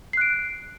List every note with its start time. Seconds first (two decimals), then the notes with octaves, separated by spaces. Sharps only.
0.13 C7
0.17 F#6
0.21 D7